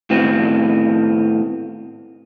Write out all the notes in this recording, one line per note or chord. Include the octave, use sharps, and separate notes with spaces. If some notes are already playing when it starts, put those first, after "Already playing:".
A2 D#3 B3 C4